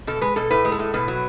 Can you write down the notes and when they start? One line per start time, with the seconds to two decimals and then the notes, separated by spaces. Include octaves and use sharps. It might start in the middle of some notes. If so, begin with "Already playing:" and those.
0.07 B2 A4
0.21 G#3 B4
0.36 B2 A4
0.51 A2 B4
0.65 G#3
0.72 A4
0.79 A2
0.94 B2 B4
1.08 F#3